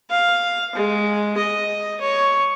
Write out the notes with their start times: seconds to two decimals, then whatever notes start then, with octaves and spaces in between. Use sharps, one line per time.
0.10 F5
0.75 G#3
1.37 D#5
2.01 C#5